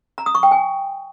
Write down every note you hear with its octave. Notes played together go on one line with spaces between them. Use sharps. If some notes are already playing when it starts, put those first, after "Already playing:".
A#5
D#6
C#6
G5
G#5